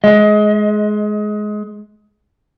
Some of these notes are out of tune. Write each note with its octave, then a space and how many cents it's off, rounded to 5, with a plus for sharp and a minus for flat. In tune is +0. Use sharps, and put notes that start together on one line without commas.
G#3 +20 D#5 +25